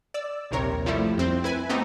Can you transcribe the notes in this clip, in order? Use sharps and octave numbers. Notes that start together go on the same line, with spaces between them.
D5 E6
A#1 D#2 C3 A#4 C#5
F3 G3 A3 E4
F2 C4
E4 B4 G#5
A3 B3 C4 D#4 G4